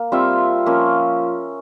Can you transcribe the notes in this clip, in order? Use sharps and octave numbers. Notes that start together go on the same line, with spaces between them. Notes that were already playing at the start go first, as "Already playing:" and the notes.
Already playing: A#3
G3 C4 F4 E5
F3 A#3 C#4